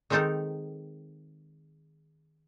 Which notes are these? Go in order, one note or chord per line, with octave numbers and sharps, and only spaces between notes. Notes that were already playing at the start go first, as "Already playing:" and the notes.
D#3 G#3 C4 D#4 A4 A#4